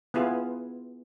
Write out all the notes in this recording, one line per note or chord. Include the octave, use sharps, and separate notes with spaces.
B3 E4 F4 G#4